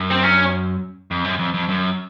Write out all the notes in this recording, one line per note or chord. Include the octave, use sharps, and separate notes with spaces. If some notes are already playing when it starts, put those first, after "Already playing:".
Already playing: F#2
C4
C#4
F2
F#2
F2
F2
F#2